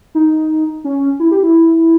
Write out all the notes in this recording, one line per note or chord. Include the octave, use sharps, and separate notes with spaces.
D#4
C#4
E4
G4
E4